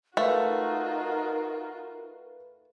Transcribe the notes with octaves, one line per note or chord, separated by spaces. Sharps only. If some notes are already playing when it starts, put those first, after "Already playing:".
A3 D#4 F4 F#4 A#4 B4 F5